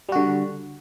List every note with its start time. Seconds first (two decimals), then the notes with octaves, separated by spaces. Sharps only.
0.09 G3
0.12 F#4
0.16 D3